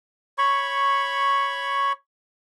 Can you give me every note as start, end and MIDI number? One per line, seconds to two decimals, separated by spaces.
0.38 1.92 73
0.38 1.92 83
0.38 1.92 85